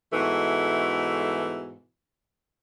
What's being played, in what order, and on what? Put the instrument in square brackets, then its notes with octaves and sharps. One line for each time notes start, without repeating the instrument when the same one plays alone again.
[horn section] G#2 B2 E3 A3